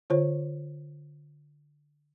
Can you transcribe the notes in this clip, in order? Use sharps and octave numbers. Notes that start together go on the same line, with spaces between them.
D3 F4 C5 C#5